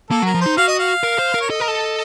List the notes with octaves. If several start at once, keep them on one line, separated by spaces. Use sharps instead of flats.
A#3 A4
F#3
A#4
F3
D#4 C5
F#4 F5
D#5
F5
A#4
C5
A#4
C#5
A4 D#5
A#4
A4